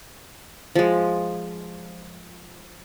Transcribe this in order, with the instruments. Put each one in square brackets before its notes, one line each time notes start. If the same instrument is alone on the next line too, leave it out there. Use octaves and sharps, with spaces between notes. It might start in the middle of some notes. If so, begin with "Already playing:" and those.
[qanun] F3 G#3